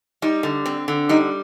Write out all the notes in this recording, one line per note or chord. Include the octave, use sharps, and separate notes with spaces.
G3 D#4
D3
C4
D3
G3 D#4